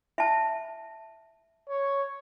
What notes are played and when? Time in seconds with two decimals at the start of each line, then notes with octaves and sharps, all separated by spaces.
0.18 E5 A5
1.69 C#5